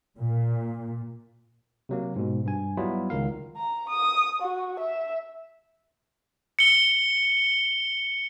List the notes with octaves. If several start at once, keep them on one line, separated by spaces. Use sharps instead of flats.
A#2
C3 F#3 A#3
G#2 B2
G2 G#5
F#3 G3 B3 E4 F4
C#2 D#3 A#4 F5
A#5
D#6
F#4
E5
C#7 G7